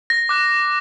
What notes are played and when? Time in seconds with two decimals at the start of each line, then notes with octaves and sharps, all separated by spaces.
0.10 A#6
0.29 D6 F#6